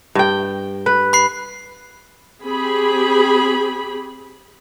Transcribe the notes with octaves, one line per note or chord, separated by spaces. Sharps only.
G2 G5
B4
B5 F#6 C7
C4 G4 G#4 B5